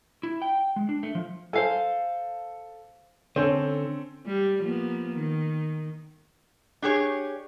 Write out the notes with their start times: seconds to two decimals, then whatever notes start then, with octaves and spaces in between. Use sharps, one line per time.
0.23 E4
0.42 G5
0.76 G#3
0.89 D4
1.03 A3
1.15 F3
1.53 A4 C5 F5 G#5
3.36 D3 C4 C#4 A4
4.27 G3
4.63 F3 A#3 B3
5.14 D#3
6.82 D4 G4 G#4 C#5